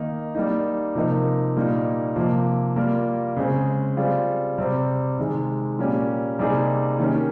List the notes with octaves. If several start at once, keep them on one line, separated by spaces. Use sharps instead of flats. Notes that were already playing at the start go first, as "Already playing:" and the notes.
Already playing: D#3 A#3 D#4
G3 A#3 D#4
C3 F3 A#3 D#4 A#4
A#2 G3 A#3 D#4
C3 F3 A#3
G3 A#3 F4 A#4
C#3 G#3 C4
G3 C4 F4 G#4
C3 G3 C4
C3 D#3 G#3
A#2 G3 A#3 C#4 G4
C3 G3 A#3 D#4 G#4
D#3 A#3 C#4 G4 A#4